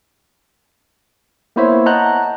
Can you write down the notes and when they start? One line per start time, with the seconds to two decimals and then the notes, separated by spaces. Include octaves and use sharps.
1.56 A#3 B3 E4 C5 C#5 E5
1.86 D#5 F#5 A5 A#5 F#6 G6